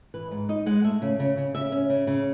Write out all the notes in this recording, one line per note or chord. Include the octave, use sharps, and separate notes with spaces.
E3 B4
G#2
D#4 D#5
G#3 F#5
A3 E5
C#3
C#3
C#3
C#3 E5
C#4
C#3
C#3